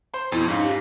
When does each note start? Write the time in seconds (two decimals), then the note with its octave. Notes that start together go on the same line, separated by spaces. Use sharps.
0.14 C5 C6
0.32 F2 B2 E4
0.48 G#2 C#4 D#4 F4
0.64 G4